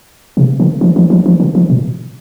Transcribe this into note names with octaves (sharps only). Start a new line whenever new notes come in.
C3
D3
E3
E3
F3
E3
D3
E3
A#2